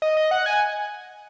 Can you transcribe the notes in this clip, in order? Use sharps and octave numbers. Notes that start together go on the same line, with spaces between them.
D#5
D#5
F#5
G#5